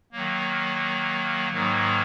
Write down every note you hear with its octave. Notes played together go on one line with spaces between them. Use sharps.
D#3 F#3 A#3
G#2 D#3 F#3 A#3